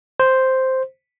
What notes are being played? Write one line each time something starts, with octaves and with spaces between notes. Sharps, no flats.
C5